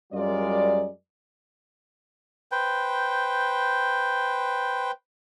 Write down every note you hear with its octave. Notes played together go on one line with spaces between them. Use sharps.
F#2 G3 G#3 F4 A#4 D5
B4 C5 G5